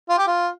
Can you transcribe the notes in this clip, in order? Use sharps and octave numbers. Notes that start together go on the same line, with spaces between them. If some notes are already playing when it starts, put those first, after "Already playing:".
F4
G4
F4